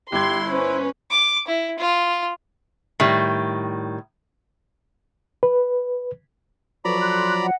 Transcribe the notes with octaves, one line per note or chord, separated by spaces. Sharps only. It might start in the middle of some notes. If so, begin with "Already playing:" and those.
G1 E4 G4 C6 G#6
C#4 B4 C5
D6
E4
F4
A2 D#3 G3
B4
F3 F#3 A4 B4 D5 A#5 B5 C#6
A4 C6 F#6
D#5 F#5